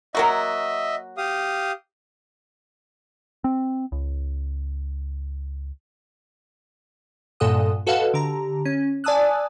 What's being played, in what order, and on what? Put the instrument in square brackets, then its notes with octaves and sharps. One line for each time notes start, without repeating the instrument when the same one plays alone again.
[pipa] F#3 A#3 F#4 [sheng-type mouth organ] D#5 E5
[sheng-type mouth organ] G4 F5 D#6
[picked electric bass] C4
C#2
[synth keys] G2 A#2 A4 F#5 D#6
F#4 A4 B4 D#5 F5 F#5
D3 G4 A#5
C#4
D5 G#5 A5 D#6 E6 F#6